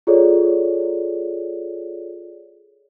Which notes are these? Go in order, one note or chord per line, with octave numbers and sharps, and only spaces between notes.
F4 G#4 A4 C#5 D5